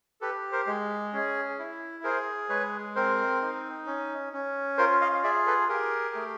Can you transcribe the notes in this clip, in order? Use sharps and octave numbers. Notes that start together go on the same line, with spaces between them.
G4 A4 B4
A#4 C5
G#3
C#4 G#4
E4
G#4 A#4 C5
G#3 B4 C#5
C4 A#4 C5
D#4
C#4
C#4
F4 A#4 C5
D#5 F5
G#4 D5 E5
A4 B4
G4 G#4 A#4
A3